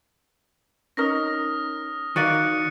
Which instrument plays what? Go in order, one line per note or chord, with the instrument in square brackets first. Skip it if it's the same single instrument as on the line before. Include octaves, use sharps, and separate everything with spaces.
[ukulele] C#4 D#4 A#4 [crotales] D#6 F6 A#6
[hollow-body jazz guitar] D#3 A#4 [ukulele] F#4 D5 F5 [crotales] F#6 C#7 D#7